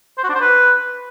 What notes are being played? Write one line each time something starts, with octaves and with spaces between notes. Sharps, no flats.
C5
F#4
D4
C5
B4